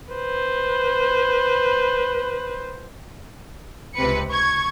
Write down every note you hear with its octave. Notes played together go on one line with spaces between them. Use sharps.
B4 C5
C#2 C3 B4 C#7
C#6 G#6